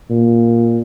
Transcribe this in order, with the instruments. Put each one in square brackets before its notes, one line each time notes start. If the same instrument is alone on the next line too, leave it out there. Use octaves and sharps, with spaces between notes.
[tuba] A#2